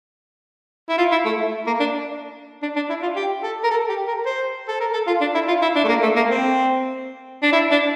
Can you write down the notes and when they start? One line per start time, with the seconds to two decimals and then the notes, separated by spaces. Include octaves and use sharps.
0.89 E4
0.98 F4
1.12 E4
1.26 A3
1.67 A#3
1.80 D4
2.62 D4
2.76 D4
2.89 E4
3.03 F4
3.16 G4
3.43 A4
3.64 A#4
3.71 A4
3.89 G4
4.08 A#4
4.26 C5
4.69 A4
4.81 A#4
4.94 A4
5.07 F4
5.21 D4
5.35 E4
5.48 F4
5.62 E4
5.75 D4
5.84 A3
5.89 A#3
6.03 A3
6.16 A#3
6.31 C4
7.43 D4
7.53 E4
7.72 D4